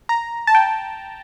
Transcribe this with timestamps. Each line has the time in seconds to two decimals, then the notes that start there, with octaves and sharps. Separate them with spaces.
0.09 A#5
0.47 A5
0.55 G5